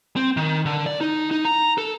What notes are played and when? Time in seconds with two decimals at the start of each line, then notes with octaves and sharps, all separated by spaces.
0.16 C4
0.37 D#3
0.66 D3
0.86 D5
1.01 D#4
1.31 D#4
1.45 A#5
1.78 A4